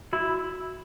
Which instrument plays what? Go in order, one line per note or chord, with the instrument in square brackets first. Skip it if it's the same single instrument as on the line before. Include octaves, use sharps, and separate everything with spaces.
[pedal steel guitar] E4 [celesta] F#4